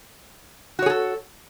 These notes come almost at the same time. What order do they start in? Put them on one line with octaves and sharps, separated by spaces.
F#4 C#5 G#4 A4